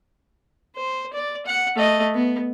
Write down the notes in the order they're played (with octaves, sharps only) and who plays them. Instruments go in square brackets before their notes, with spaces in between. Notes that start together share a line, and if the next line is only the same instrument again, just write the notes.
[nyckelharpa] C5
D5
F#5
A3 D#5
B3